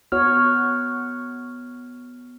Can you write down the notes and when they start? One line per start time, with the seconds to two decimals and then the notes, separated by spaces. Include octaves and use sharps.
0.12 B3 F#4 C#5 F6